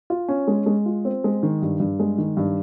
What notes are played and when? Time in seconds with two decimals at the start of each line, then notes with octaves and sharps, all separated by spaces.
0.10 F4
0.28 C#4
0.48 G#3
0.66 G#3
0.86 F4
1.05 C4
1.24 G#3
1.43 D#3
1.62 G2
1.80 G2
2.00 G#3
2.18 D#3
2.37 G2